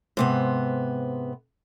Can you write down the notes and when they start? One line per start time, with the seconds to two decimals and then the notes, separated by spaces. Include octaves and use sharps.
0.17 G#2 C3 B3